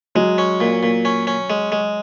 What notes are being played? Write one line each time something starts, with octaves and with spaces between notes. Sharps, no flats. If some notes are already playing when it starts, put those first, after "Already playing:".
F#3 G#3
C#4
A#2
A#2
C#4
C#4
G#3
G#3